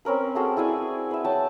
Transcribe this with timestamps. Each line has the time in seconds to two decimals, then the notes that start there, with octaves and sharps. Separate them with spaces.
0.05 C4 C#4 A#4 B4
0.35 F#4 G#4 A4 G5
0.57 E4 G#4 D5 G#5
1.11 B4 E5
1.24 F#3 G5 A5